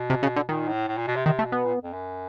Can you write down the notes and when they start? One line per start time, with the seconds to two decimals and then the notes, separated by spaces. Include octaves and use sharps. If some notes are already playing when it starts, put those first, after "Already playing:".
Already playing: B2
0.10 C3
0.23 C#3
0.36 D3
0.49 A#2 D#3
0.68 A2
0.88 A2
0.98 A#2
1.07 B2
1.16 C3
1.26 C3 D#3
1.39 A3
1.45 B2
1.52 B3
1.64 A#2
1.83 F2
1.93 F#2